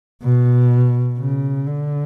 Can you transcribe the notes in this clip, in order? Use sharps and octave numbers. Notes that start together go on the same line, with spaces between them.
B2
C#3
D3